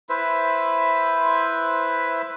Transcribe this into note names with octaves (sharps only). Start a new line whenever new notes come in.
E4 B4 C5 E5